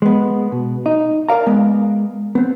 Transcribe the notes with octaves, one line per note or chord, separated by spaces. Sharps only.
G#3 B3
B2
D#4
A#4 D5 F5 A#5
G#3 B3
B3 C4